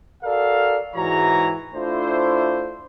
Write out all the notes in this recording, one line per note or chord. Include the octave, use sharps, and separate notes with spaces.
F#4 A4 A#4 D5 F5
G#2 E3 G#3 F#4 C#5 A#5
A3 D4 E4 F4 C5